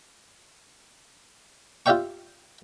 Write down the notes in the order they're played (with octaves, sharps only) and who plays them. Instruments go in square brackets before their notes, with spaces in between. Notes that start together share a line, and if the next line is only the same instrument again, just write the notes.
[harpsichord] F4 G4 D5 E5 G5 C#6